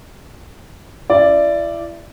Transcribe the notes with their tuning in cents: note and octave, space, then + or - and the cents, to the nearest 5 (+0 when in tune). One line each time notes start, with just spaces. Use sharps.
E4 +30 D5 +0